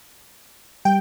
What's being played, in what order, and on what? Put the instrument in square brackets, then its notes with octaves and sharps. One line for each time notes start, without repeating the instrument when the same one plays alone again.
[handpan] G3 [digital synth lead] G5